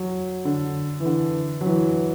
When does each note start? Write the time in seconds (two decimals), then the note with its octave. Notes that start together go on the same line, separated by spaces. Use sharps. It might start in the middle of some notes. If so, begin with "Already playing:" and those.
Already playing: F#3
0.45 D3
1.00 E3
1.05 D3
1.61 F#3
1.66 E3